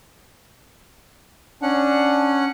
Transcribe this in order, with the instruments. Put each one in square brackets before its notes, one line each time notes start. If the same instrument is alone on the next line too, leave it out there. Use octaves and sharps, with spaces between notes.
[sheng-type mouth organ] C#4 F#5 [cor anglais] D4